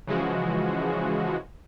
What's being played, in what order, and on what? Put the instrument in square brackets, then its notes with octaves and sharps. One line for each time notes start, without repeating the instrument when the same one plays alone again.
[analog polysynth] C#3 E3 F3 G#3 F#4